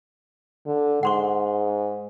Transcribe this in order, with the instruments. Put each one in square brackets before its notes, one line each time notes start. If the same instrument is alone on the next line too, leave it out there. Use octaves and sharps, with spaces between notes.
[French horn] D3
[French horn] G#2 [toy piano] F#5 C6 C#6